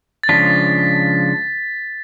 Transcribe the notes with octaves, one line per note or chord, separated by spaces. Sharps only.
A6
C#3 F3 G#3 D4 F4 B6